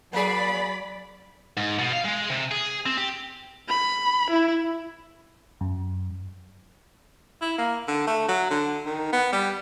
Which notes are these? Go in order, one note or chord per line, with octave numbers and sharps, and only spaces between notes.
F#3 A#3 G#4 D5 B5
G#2
B2
F5
G#3
C3
G#4
C4
G4
B5
E4
F#2
E4
A#3
D3
A3
F#3
D3
D#3
B3
G3